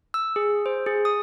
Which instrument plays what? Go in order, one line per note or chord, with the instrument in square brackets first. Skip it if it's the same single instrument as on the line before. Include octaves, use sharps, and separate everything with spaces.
[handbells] E6
G#4
C5
G#4
D#6